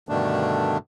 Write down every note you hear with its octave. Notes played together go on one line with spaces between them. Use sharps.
G2 B2 D3 D#3 A3 D4